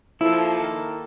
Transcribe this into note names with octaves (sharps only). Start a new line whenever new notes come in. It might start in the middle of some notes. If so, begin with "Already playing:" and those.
F3 A#3 E4 A4
D#3